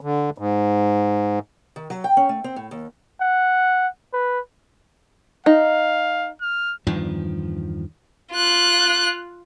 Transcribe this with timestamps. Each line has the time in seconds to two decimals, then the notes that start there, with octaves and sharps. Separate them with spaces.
0.01 D3
0.38 G#2
1.76 D#3
1.90 F#3
2.04 G5
2.17 C#4
2.29 A3
2.44 C4
2.56 A2
2.71 D#2
3.21 F#5
4.13 B4
5.46 D#4 F5
6.41 F6
6.87 E2 G2 D#3 F3
8.32 F4 F#6